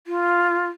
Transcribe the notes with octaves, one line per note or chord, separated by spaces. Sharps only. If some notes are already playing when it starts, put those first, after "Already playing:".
F4